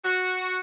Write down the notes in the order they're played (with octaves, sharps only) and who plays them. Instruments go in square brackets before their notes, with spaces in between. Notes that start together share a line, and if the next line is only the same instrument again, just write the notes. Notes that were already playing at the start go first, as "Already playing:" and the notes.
[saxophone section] F#4